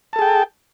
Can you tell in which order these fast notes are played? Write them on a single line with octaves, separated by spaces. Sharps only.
A5 A4 G#4 G5